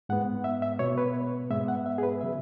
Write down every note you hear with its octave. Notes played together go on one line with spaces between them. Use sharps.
G#2 G#3 B3 F#5
E5
E5
B2 B3 C#5
B4
G#2 G#3 B3 E5
F#5
E5
G#4
B4
C#3 F#3 E5